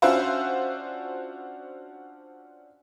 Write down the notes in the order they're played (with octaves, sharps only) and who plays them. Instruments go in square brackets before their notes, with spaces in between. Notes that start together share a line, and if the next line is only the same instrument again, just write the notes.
[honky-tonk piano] C#4 D4 F4 F#4 C5 E5